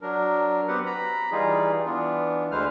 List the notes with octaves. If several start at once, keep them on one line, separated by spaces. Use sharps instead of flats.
F#3 D4 A#4
B3 C4 G4 B4 F#5
A#5 B5
E3 G3 D#4 F4 G#4
E3 B3 D4 F4
D2 D3 G#3 B4 C5 F6